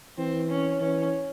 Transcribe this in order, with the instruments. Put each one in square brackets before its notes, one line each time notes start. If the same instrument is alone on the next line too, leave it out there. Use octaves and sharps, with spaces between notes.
[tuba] E3 [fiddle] C4
[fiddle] C#4
[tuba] E3 [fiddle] C#4